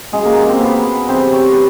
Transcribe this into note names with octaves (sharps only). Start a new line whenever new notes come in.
C#3 F#3 G#3 G#4
A#3 A#4
C4 C5
B3 B4
C3 E3 G3 C4 C5
C#5
C5
B4